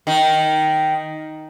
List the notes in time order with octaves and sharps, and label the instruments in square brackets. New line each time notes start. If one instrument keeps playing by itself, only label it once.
[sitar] D#3